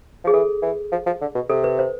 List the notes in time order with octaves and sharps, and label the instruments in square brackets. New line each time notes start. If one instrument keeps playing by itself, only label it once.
[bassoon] F3 [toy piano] G#4
[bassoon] E3 [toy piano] A4
[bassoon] E3
F3
F3
D3
B2
[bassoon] C3 [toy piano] A4
[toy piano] B4
C5